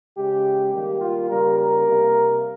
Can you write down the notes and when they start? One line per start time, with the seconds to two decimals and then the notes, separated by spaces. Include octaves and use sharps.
0.17 C#3 G#3 G4
0.73 D#3 G3 A#3 G4
1.01 F4
1.29 C#3 G3 A#3 A#4
1.58 A#4
1.85 C3 G3 A#3